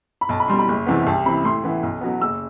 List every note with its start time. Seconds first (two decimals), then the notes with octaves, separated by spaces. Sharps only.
0.21 B5
0.29 B1 A5
0.40 B5
0.48 B2 G3 C6
0.59 B5
0.69 F#1
0.86 E2 C3 E3 B3
1.07 C2 A5
1.26 C3 E3 B5
1.44 A2 C6
1.64 E3 B3 E4
1.83 B1
2.01 B2 F#3 B3
2.21 F#1 E6